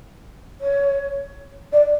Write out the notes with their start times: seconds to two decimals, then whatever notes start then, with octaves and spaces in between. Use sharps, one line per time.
0.60 C#5
1.72 D5